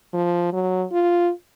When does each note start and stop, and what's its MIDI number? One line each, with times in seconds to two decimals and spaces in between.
0.13 0.48 53
0.53 0.84 54
0.92 1.31 65